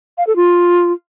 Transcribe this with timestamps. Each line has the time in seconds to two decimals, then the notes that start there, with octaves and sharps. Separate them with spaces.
0.18 F5
0.27 A4
0.36 F4